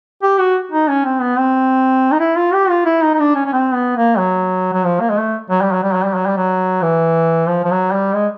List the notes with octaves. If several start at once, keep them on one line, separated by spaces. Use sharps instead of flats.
G4
F#4
D#4
C#4
C4
B3
C4
D#4
E4
F4
G4
F4
E4
D#4
D#4
D4
C#4
C#4
C4
B3
A#3
F#3
F#3
F3
A#3
G#3
A3
F#3
G3
F#3
G3
F#3
G3
F#3
G3
F#3
E3
F3
F3
F#3
G3
G#3